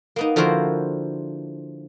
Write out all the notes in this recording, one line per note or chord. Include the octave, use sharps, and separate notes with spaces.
A#3 B3 D#4
D3 F3 E4 F#4 A#4 C5